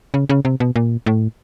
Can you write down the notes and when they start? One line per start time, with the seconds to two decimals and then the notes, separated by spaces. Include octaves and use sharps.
0.14 C#3
0.29 C#3
0.45 C3
0.60 B2
0.76 A#2
1.06 A2